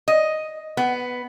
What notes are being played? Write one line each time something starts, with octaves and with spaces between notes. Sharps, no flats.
D#5
B3